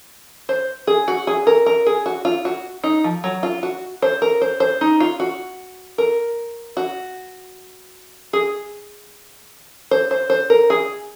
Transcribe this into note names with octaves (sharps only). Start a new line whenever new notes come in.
C5
G#4
F#4
G#4
A#4
A#4
G#4
F#4
F4
F#4
D#4
F3
F#3
F4
F#4
C5
A#4
C5
C5
D#4
F4
F#4
A#4
F#4
G#4
C5
C5
C5
A#4
G#4